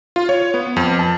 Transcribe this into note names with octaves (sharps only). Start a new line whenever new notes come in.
F4
C#5
B3
F2
A5